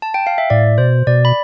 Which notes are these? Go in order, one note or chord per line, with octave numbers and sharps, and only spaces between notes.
A5
G5
F5
E5
A2 D5
B2 C5
B2 D5
B5